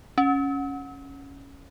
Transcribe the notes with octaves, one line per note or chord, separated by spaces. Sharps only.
C#4